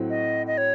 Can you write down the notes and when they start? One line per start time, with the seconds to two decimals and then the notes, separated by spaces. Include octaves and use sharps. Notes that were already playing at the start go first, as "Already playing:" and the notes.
Already playing: A2 F#3 C4 F#4
0.10 D#5
0.47 D#5
0.58 C#5